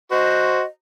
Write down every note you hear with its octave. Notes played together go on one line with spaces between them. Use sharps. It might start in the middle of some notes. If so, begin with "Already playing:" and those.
F#4 C5 D#5